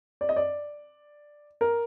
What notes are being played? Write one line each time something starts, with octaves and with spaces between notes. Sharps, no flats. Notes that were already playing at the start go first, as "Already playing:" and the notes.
D5
D#5
D5
A#4